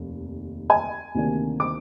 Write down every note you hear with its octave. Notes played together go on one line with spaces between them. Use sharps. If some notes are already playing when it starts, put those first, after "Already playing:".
Already playing: F1 D#2 D#3
G#5
D2 C3 D#3 A#3 D4
D6